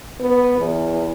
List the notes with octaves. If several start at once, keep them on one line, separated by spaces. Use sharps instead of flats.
B3
E2